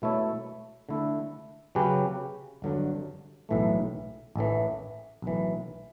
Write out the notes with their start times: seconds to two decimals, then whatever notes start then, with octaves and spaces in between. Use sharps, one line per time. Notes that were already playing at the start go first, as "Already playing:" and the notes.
0.02 B2 A3 E4 A4 C#5
0.89 D3 A3 E4
1.75 C#3 F#3 C#4 G4 B4
2.62 G1 G2 D3 F#3
3.49 B1 A2 E3 A3
4.36 A1 A2 E3
5.22 B1 A2 E3